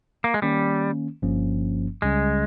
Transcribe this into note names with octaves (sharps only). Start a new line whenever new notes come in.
A#3
G#3
D#3 G3 A#3 C#4
G1 G2 F3 A#3 C#4
C#2 C#3 G3 G#3 C#4